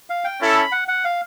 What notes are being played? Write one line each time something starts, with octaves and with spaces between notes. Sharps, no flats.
F5
G5
C#4 E4 A4
B5
F#5
F#5
F5